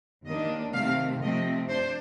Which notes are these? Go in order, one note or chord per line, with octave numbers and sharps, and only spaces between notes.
D#2 D#3 A#3 D4 D#5
C3 D#3 A3 C4 F5
C3 F3 A3 C4 D#5
D4 C5